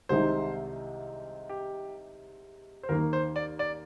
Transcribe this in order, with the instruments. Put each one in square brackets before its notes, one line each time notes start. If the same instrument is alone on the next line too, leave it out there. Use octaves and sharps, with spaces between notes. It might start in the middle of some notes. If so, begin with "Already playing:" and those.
[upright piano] C2 C3 D#3 G#3 D#4 [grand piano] C5
[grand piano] G4
C5
[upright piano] D#2 D#3 A#3 [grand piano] A#4
[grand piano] C5
D5
D5